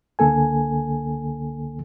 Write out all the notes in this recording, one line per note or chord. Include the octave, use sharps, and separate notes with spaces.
C#2 D3 A#3 A4 G#5